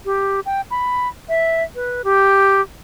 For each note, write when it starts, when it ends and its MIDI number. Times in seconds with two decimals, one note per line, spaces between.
0.05 0.40 67
0.46 0.61 79
0.71 1.08 83
1.29 1.63 76
1.75 2.02 71
2.04 2.61 67